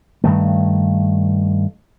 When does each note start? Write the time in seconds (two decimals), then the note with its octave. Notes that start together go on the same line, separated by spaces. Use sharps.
0.24 G2 D#3 A3